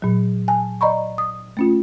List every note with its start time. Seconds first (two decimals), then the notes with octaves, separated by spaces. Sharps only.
0.02 A#2 F#3
0.48 G#5 A5
0.81 D5 D#5 A#5 B5 C#6
1.18 D#6
1.57 A3 C#4 F4